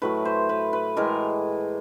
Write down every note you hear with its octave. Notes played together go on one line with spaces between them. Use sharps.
A2 F#3 A3 B4
C5
B4
B4
A2 E3 G#3 A#4